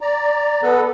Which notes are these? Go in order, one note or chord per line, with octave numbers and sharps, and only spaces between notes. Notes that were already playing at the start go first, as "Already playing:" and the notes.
D5 A#5
B3 A4 B4